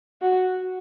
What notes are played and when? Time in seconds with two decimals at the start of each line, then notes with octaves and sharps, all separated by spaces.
0.22 F#4